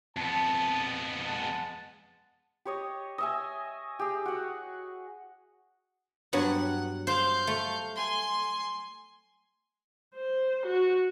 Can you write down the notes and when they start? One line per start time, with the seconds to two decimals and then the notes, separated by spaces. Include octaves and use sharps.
0.17 F2 B3 A5
1.25 G#3 F#5 A5
2.65 G4 C#5 D#5
3.18 D#5 E5 G#5
3.99 G4 G#4
4.25 F#4 F#5
6.33 G2 F#3 B3 F#5
7.07 C5 F5 G6
7.47 A3
7.96 G#5 C6
10.16 C5
10.66 F#4